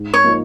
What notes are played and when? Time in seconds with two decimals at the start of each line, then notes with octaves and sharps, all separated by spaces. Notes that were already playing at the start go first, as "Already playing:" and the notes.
Already playing: G#2
0.14 C#5
0.24 F3 A#3 D#4